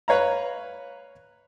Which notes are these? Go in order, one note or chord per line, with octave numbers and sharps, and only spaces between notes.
B4 C#5 F5 A#5